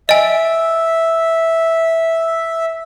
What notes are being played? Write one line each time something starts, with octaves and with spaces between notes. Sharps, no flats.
D#5 E5 G#5